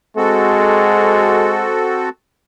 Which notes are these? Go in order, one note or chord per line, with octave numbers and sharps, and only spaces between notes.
G#3 C4 F#4 A4